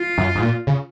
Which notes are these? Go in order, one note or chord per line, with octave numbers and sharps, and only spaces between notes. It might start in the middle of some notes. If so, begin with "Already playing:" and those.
Already playing: F4
F#2
G#2
A#2
C#3